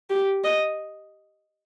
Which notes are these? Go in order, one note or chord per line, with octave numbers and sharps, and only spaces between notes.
G4
D#5